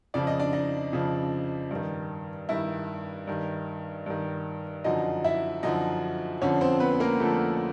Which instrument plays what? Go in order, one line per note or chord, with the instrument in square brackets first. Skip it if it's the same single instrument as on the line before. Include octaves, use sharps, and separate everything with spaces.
[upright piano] F2 C#3 F3 D5
D#5
D4 D5
D#4 D#5
F2 C#3 F3
G2 D#3
G2 D#3 E4 E5
G2 D#3
G2 D#3
F#2 D3 F3 D#4 D#5
E4 E5
F#2 D3 F3 D#4 D#5
F2 D3 F3 C#4 C#5
C4 C5
B3 B4
A#3 A#4
F2 D3 F3 A3 A4